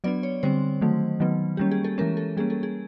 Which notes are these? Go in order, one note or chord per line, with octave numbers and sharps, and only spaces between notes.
F#3 B3 D4 D5
C#5
D3 G3 C4 C5
D#3 F#3 A3
D#3 F#3 B3
G3 A#3 C#4 G4
G#4
A4
E3 G#3 C#4 A#4
A4
G3 A#3 C#4 G#4
A4
G#4